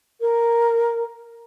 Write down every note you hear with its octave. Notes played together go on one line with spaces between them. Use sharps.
A#4